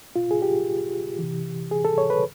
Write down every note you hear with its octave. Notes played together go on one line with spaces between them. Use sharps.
B2 F4
G#4
G4
C3 E3
G#4
A4
C#5
B4